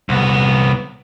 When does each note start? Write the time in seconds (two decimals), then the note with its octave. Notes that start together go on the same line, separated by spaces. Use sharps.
0.09 C2 B3